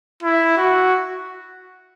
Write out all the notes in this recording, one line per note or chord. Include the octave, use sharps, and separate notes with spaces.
E4
F#4